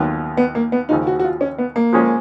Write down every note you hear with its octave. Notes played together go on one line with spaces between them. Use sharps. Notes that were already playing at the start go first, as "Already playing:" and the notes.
Already playing: D#2 D#3 F#3 B3 F4
B3
A#3
B3
D#2 C#3 F3 D#4
F#4
F#4
F4
C#4
B3
A#3
F3 G#3 C#4 G#4